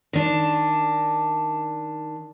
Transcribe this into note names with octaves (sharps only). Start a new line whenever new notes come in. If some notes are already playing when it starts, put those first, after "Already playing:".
D#3 D4